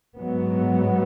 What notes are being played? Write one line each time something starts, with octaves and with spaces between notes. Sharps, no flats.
G#2 F#3 B3